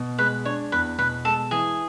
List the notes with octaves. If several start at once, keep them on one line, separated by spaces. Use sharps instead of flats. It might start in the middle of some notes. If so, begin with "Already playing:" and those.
Already playing: B2
G#3 B4
D4 C#5
E2 B4
B2 B4
G#3 A4
E3 G#4